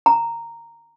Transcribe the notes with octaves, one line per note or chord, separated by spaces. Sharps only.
A#5